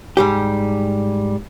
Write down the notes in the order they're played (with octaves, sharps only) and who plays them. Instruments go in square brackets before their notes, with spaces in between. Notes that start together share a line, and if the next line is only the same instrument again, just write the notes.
[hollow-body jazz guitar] G#2 G3 G4